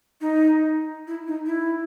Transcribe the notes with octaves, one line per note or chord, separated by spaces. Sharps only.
D#4
E4
D#4
E4